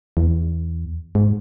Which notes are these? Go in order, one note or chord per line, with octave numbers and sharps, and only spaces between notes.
E2
G#2